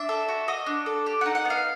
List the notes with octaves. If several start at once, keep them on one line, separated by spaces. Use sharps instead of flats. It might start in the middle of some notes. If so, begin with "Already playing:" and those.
Already playing: D4 E5
A4
F#4
F#4 D#5
D4
A4
G4
D#4 F#5
F#5
B3 F5